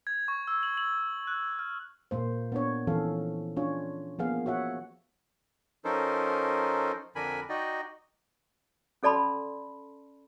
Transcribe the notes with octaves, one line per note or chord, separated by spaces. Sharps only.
G#6
C#6
E6
F#7
F#7
F#6
F6
A#2 A#3 C5
B3 D4 C#5
E3 F3 C#4 A4 F5
C#4 D4 F4 C#5
F3 A#3 B3 G#4 F5
F#4 C#5 E5 F#5
F3 C#4 D#4 A4 A#4 C5
F2 D3 D4 A#4 G#5 B5
D#4 F#4 D5 D#5 G5
C#4 A4 D5 A5 B5 C6